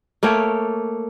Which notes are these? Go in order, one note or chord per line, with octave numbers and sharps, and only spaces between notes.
A3 A#3 C#5 G5